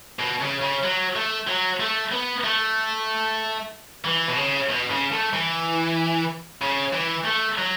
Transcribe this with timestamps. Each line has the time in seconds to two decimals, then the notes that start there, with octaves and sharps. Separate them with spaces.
0.19 B2
0.40 C#3
0.61 C#3
0.83 F#3
1.16 A3
1.47 F#3
1.80 A3
2.12 B3
2.44 A3
4.05 E3
4.28 B2
4.36 C#3
4.69 B2
4.91 C#3
5.12 A3
5.33 E3
6.62 C#3
6.93 E3
7.25 A3
7.58 F#3